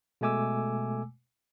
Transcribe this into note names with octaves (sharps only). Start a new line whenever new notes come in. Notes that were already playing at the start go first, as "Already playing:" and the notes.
B2 G#3 A3 G#5 D6 E6